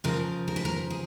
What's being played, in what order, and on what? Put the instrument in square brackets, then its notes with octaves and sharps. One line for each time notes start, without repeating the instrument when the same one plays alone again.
[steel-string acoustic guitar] C#3 F3 A#4
A#4
B4
A#4
G#4